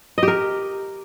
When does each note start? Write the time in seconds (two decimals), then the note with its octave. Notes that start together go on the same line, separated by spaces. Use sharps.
0.18 D#5
0.23 G4
0.28 A#4